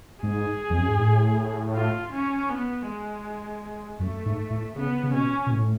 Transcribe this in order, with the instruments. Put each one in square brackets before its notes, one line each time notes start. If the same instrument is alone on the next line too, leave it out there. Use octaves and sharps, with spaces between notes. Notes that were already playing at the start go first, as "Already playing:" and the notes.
[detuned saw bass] G#2 [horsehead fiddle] G#4
[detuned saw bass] F2
F#2
G#2
A2
[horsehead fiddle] F4
C#4
B3
G#3
[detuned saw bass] F#2 [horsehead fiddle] A3
[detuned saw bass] G#2
A2
[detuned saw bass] C#3 [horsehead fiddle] B3
[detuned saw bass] C#3
[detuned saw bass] B2 [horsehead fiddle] C#4
[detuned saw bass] B2
A2